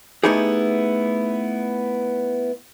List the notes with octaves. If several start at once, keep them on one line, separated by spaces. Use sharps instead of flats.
A3 B3 D#4 E4 G4 G#4